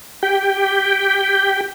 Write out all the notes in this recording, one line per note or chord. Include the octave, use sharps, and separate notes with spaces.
G4 G5